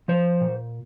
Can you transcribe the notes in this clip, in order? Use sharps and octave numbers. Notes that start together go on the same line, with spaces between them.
F3 C5
A#2